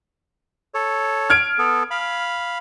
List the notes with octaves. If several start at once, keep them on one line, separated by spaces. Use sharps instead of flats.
A4 C#5
F6 G#6 D7
B3 A4
F5 B5